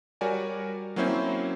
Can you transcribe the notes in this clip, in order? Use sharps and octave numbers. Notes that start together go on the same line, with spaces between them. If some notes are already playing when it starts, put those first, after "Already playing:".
G3 F#4 A#4 C#5 D5 G#5
F#3 A#3 C4 C#4 E4 C5